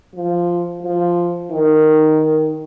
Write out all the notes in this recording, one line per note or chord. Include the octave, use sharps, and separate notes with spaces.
F3
F3
D#3